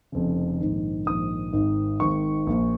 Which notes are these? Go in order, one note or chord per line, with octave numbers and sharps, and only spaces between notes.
F1 F2 C#3
A#1 G#2 D#3
A#1 G#2 D#3 D#6
G#1 G#2 D#3
G#1 G#2 D#3 C#6
A#1 A#2